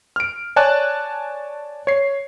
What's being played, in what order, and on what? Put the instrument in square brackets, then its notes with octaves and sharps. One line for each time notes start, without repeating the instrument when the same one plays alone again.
[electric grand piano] F6 D7
C#5 D5 G#5 A5 F#6
C#5 C7